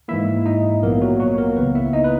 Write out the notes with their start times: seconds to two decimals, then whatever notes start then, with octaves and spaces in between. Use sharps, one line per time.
0.08 G#2 E3 A#3 E4 E5
0.46 D#4 D#5
0.82 A#1 A#2 F#3 A#3 B3 A#4
1.02 F#3 F#4
1.20 F#3 F#4
1.38 A#3 A#4
1.56 C#2 C#3 E3 A#3 B3 B4
1.75 E4 E5
1.93 D#4 D#5
2.04 B4